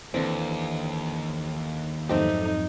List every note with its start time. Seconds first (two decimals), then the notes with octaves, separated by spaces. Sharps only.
0.14 D#2 D3 E3 C4
2.09 F2 G#2 F#3 A3 C4 D#4 G4